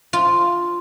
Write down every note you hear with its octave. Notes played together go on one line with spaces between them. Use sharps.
F4